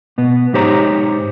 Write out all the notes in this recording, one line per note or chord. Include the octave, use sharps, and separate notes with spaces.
B2 B3
G#2 D#4 G4 C5 C#5 A#5